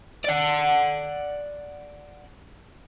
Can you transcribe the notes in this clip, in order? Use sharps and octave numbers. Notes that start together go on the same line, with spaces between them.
D5 F#5